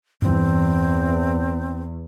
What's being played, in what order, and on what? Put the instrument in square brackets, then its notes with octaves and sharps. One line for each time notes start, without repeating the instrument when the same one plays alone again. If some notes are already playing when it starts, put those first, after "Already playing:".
[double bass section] E2 [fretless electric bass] G2 E3 [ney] C4